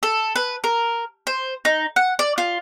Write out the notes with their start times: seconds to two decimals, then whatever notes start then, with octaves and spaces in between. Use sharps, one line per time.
0.03 A4
0.36 B4
0.64 A#4
1.27 C5
1.65 D#4
1.96 F#5
2.19 D5
2.38 F4